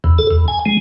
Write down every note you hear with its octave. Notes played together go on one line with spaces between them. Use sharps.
E2
A4
E2
G#5
G#3